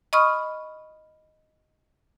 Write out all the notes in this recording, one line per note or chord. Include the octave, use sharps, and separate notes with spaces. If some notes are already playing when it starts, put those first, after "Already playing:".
D#5 B5 C#6 D#6 F6